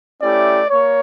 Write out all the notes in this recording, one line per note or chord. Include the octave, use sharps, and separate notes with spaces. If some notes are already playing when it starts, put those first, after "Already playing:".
A3 C#4 E4 G4 D5
A#3 C#5